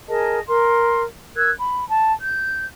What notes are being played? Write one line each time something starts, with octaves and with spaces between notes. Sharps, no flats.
G#4 A#4 D#5 A5
A#4 C6
A#4 E6 F#6 G#6
B5
A5
G6